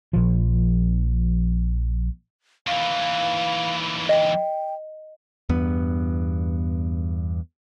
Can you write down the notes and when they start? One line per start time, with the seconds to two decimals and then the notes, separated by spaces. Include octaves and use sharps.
0.13 A#1 F3
2.67 D#2 E3 F5
4.09 D#5 G5
5.49 E2 G2 B3